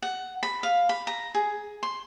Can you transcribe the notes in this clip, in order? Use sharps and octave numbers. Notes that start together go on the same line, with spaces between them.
F#5
B5
F5
B5
A#5
G#4
C6